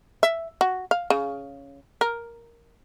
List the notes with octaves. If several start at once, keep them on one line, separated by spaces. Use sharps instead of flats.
E5
F#4
F5
C#3
A#4